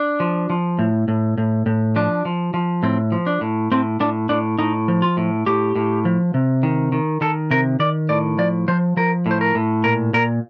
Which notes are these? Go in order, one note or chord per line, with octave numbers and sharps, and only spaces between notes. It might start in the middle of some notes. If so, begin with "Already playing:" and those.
Already playing: D4
F3
F3
A2
A2
A2
A2
F3 D4
F3
F3
A2 C4
F3
D4
A2
A2 C4
A2 D4
A2 D4
A2 D#4
F3
F4
A2
A2 G4
A2
F3
C3
D#3
D#3
D#3 A4
C3 A#4
D#3 D5
A2 D5
F3 D5
F3 C5
F3 A#4
A2
C5
A#4
A2
A#2 A#4
A#2 A#4